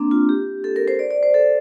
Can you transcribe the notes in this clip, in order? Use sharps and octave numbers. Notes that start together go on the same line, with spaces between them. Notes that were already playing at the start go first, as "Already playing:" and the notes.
Already playing: A#3 C4 D4
F4
G4
A4
A#4
C5
D5
D5
C5
A4